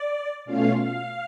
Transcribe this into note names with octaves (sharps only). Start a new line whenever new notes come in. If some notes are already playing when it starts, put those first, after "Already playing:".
Already playing: D5
B2 A3 C#4 F4 F5
F5